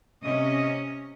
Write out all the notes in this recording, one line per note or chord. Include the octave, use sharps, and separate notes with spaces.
C3 C#4 D#5